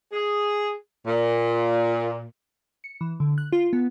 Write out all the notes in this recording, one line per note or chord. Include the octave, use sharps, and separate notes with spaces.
G#4
A#2
C#7
E3
D3
F#6
F4
B3